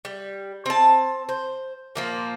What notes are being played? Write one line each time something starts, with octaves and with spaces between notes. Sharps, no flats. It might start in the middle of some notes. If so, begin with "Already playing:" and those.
G3
C4 A5
C5
A#2 F3 A#3